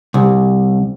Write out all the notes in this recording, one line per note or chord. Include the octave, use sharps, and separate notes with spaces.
C2